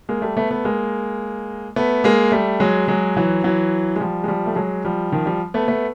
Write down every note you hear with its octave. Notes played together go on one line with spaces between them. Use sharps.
G#3 A#3
G3 A3
A3 B3
A3 B3
G#3 A#3
A3 B3
G#3 A#3
G3 A3
F#3 G#3
F#3 G#3
E3 F#3
E3 F#3
G#3
F3 G3
G#3
F3 G3
A3
F#3 G#3
F3 G3
D#3 F3
F3 G3
A3 B3
A3 B3